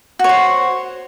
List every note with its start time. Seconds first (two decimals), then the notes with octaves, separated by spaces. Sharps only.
0.19 F#4
0.24 C#5
0.29 C5